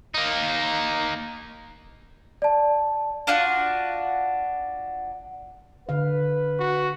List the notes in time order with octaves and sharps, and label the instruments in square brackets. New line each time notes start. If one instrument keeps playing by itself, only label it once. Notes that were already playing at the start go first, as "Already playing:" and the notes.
[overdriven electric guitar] A#3 D#4
[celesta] D5 A5
[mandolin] D4 F4 F#4 F#5
[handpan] D3 F5 [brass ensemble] B4
[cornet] F#4